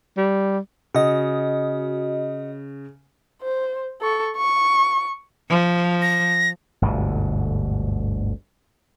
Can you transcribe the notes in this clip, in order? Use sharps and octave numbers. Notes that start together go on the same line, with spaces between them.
G3
C#3 F#4 D#5
C5
A4 C#6
C#6
F3
A#6
G1 D2 G#2 B2